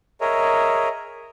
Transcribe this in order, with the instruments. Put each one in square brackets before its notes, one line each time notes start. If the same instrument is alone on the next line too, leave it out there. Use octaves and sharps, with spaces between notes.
[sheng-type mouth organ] G#4 A#4 C#5 D#5 E5